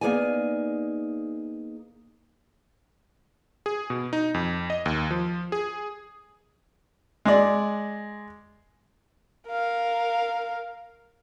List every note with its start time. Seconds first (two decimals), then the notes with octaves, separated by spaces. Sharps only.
0.01 A#3 B3 D#4 G#4 D5 G#5
3.66 G#4
3.90 B2
4.13 D#4
4.34 F2
4.70 D#5
4.86 D#2
5.11 F3
5.52 G#4
7.25 G#3 D5
9.49 A#4 F5